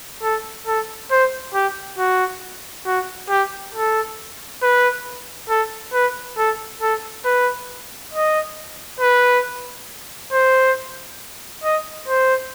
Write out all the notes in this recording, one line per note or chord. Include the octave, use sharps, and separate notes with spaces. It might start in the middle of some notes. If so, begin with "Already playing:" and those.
A4
A4
C5
G4
F#4
F#4
G4
A4
B4
A4
B4
A4
A4
B4
D#5
B4
C5
D#5
C5